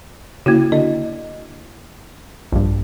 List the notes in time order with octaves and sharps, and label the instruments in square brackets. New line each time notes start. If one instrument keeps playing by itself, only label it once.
[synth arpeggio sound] C#3 [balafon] A#3 E4 F#4
[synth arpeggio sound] D3 [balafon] D#5
[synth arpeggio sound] A#1 G2